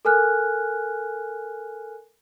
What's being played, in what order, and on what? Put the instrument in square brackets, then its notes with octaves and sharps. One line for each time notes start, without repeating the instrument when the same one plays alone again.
[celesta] A4 A#4 G#5 F6 F#6